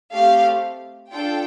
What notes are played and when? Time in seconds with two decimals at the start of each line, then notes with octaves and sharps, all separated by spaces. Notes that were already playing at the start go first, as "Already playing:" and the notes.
0.13 A3 C4 G4 F5
1.11 D4 F4 A4 G5